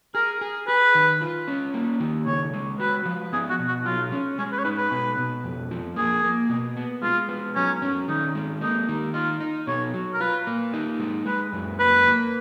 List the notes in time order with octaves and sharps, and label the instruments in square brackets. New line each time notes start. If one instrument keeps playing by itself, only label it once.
[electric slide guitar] G#4 [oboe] A#4
[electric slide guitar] G#4
[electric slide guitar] G#4 [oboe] B4
[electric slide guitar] D#3
F4
C#4
A#3
D#3
[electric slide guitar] C#3 [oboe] C#5
[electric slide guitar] G#3
[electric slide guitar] F#4 [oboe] B4
[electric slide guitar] F3
[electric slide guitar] B3 [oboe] G#4
[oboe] F#4
[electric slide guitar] B2
[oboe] F#4
[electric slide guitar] F#3 [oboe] F4
[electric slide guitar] C#4
[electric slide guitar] G#3 [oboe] C#4
[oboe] B4
C#5
[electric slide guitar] D#4 [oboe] B4
[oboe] B4
[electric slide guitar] B2
B2
F2
F3
[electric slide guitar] A#3 [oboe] G#4
[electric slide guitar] A#3
B2
B3
[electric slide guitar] G#3 [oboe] F4
[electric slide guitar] B3
[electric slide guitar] F#3 [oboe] C#4
[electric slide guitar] C#4
[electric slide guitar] D#3 [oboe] D#4
[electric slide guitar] G#3
[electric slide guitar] A#3 [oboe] D#4
[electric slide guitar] D#3
[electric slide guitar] D#4 [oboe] F4
[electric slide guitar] D#4
[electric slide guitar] B2 [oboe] C#5
[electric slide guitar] F#3
[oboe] A#4
[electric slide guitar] F4 [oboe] B4
[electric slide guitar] A#3
D#4
G#3
[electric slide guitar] G#3 [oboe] B4
[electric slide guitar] F#2
[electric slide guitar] A#3 [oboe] B4
[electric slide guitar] A#3